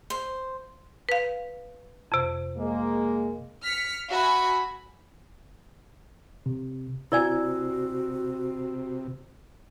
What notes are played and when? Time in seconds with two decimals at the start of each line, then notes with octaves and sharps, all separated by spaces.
0.10 C5
1.09 B4 F5
2.12 F2 C3
2.58 G#3 A#3
3.63 F6 B6 C#7
4.09 F#4 E5 G#5 B5
6.46 C3
7.12 C3 E4 F#4 D5 G#5 E6